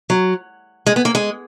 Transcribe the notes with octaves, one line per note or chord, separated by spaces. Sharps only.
F#3
G#3
B3
A#3
G#3